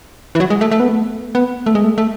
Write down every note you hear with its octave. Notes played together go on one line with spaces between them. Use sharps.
E3
F#3
G#3
A3
A3
B3
A3
B3
A3
G#3
A3
A3